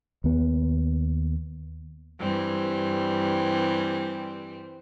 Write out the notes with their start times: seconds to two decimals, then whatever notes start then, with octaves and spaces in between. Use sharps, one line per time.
0.24 D#2 B3
2.19 G2 E3 G3 C4